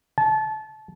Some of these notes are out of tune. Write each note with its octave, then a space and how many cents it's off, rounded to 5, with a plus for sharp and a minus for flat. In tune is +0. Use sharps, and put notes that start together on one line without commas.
A5 -25